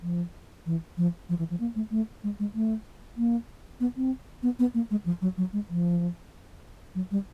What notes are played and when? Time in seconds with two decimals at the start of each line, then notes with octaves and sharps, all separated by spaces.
0.02 F3
0.66 E3
0.97 F3
1.29 F3
1.39 E3
1.50 F3
1.60 A#3
1.76 A3
1.91 A3
2.24 G#3
2.39 G#3
2.55 A3
3.17 A#3
3.80 B3
3.97 C4
4.43 B3
4.59 B3
4.74 A#3
4.91 G#3
5.06 F3
5.22 F#3
5.37 F#3
5.53 G#3
5.69 F3
6.95 F#3
7.11 G3